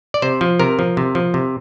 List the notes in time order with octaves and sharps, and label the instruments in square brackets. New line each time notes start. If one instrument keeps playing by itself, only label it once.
[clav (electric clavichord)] D5
C3 C5
F3
C3 A#4
F3
C3
F3
C3